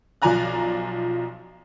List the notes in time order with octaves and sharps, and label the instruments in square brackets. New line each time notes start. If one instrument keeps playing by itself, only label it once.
[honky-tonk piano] B1 F3 D5 G#5 A#5 F#6